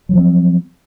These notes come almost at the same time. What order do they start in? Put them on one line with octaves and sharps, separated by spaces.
F#3 F3 C4